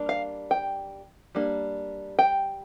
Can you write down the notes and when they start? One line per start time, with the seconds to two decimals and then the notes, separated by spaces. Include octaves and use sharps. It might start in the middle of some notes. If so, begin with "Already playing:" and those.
Already playing: G3 A#3 D4
0.09 F5
0.51 G5
1.35 G3 A#3 D4
2.19 G5